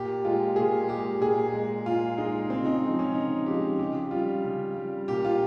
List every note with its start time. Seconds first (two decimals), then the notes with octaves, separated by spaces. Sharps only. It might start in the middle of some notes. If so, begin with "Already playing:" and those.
Already playing: A#2 G4
0.24 G#3 F4
0.56 A#2 G#4
0.89 G#3 G4
1.21 A#2 G#4
1.53 G#3
1.86 A#2 F4
2.18 G#3 D#4
2.50 C#3 C4
2.66 D#4
2.82 F3 G#3
2.99 C#4
3.14 C#3 D#4
3.46 F3 G#3 G4
3.79 C#3 G4
4.11 G3 F4
4.44 C#3
4.76 G3
5.08 A#2 G4
5.25 F4